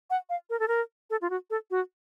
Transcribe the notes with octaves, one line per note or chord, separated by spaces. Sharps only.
F#5
F5
A#4
A4
A#4
A4
F4
F#4
A4
F#4